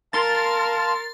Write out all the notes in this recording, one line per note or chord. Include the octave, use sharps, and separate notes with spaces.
A#4 F5 A5 C6 A6